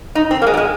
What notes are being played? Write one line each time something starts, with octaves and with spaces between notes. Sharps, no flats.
D#4
C4
A#3
G#3
F#3
G#3